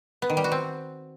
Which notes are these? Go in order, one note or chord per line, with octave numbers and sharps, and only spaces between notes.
B3
D#3
G3
F#4
C4